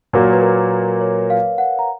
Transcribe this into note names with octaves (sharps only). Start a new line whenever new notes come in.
A#2 F#3 A#3 A#4
B4
A#4
C#5
F5
F#5
A#5